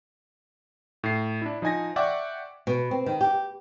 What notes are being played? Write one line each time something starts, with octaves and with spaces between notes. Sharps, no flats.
A2 C7
D4 E4
F3 D#4 D#5 G#5 G#6 A#6
D5 E5 F#5 G5 C#6 D6
B2
C4
D#3
G4